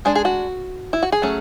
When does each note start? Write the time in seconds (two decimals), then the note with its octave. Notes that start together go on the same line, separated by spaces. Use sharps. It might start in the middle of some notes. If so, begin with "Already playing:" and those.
0.05 G#3 D4 G#4
0.15 G#4
0.25 F#4
0.93 E4
1.03 F#4
1.12 G#4
1.22 F#3 A3 C#4